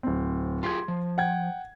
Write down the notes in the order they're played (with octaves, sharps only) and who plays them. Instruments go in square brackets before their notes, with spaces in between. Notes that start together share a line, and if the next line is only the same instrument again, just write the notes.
[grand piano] D1 C4
[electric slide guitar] F4 G4 G#4 [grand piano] C6 G#6
[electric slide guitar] F3
[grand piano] F#5 G5 G#6